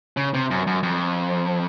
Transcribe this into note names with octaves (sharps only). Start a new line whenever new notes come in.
C#3
C3
F#2
F#2
F2